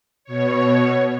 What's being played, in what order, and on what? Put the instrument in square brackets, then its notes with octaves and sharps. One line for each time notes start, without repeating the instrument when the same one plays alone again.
[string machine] B2 C#5